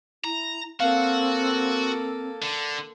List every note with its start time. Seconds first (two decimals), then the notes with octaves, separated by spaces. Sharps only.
0.25 E4 A#5
0.80 A#3 C4 F#4 A4 F5
2.42 D3